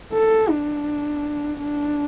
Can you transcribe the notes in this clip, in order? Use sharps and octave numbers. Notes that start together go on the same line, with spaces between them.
A4
D4
D4